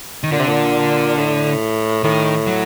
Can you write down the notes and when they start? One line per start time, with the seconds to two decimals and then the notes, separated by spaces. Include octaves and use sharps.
0.23 D#3
0.32 A#2 D3
0.39 C3
0.48 A#2
1.18 A2
2.04 A2 D#3
2.47 F#3